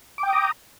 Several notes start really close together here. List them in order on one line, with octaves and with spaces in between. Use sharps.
D6 G5 D#6 A#5